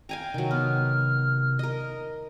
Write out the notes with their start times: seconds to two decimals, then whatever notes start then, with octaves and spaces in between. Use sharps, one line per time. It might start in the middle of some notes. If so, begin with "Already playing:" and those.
0.09 F5 G5 G#5 A#5
0.34 C3 D#3 F#3
0.51 B3 F6
1.59 A#4 D#5